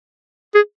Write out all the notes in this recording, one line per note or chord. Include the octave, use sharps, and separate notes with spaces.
G#4